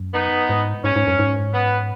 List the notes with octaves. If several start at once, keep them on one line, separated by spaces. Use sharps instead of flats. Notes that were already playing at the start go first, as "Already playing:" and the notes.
Already playing: F#2
B3 D#4
G#2
G#2 C#4
G#2
F#2
G#2
B3